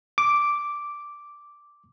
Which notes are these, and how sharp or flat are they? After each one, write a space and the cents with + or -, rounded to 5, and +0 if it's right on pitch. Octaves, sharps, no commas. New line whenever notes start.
D6 -5